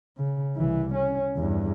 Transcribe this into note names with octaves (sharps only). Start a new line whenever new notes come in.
C#3
C2 E3
C#4
E2 G2